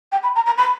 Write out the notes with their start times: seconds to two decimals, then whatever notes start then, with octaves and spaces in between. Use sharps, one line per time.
0.12 G5
0.23 B5
0.36 A#5
0.46 A#5
0.58 B5